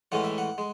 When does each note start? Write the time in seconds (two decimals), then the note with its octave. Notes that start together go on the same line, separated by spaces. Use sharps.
0.12 A2 E3 G#3 C#4 F#5
0.24 E5
0.38 F#5
0.58 G#3